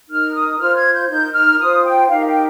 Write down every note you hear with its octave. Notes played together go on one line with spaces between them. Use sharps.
D#4 A#4 F6
D#6
F4 C5 F6
G#6
G6
D#4 A#4 G6
F6
F4 C5 D#6
G5
D#4 G4 A#4 F5
G5